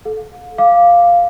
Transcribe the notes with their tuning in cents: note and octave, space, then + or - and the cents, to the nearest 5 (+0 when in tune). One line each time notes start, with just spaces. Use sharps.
A4 -20 F5 +40
F5 +0 D6 +0